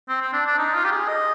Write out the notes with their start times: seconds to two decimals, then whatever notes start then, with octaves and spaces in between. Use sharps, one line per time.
0.09 C4
0.21 C4
0.33 D4
0.46 D4
0.58 D#4
0.75 F4
0.85 G4
0.92 G#4
1.08 D#5